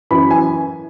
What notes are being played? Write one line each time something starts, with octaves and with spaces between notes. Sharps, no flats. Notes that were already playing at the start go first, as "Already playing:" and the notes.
F#2 E3 B5
G#5